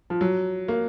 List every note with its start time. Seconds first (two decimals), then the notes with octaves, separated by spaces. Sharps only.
0.10 F3
0.21 F#3
0.68 A#3